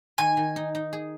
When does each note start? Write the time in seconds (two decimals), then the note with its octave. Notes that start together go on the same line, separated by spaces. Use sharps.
0.18 D#3 G#5
0.37 D#3
0.56 D#4
0.75 D#4
0.93 G#4